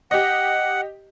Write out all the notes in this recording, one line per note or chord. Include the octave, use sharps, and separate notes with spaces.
G4 D#5 F#5